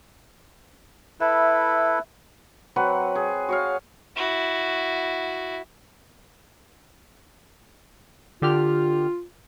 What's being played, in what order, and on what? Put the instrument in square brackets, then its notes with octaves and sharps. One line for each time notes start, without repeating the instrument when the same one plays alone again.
[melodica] E4 A4 B4 [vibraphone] E5
[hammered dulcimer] F#3 C4 B4 F#5
G#4
F#4 C#5 F5
[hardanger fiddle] E4 F#4
[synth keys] D3 G4 F6 [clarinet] F4